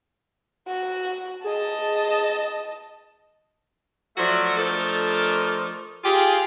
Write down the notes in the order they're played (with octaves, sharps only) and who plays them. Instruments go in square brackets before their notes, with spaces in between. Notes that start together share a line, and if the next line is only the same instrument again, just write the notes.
[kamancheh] F#4
[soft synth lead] G#4 [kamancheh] D#5 A5
[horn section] F3 F#3 A3 F#4 D5 E5
F3 A3 D4 A4 A#4 D#5
F4 G4 G#4